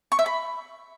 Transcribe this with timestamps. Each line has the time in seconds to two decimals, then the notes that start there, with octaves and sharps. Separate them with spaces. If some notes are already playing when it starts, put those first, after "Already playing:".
0.12 C#6
0.19 E5
0.26 B5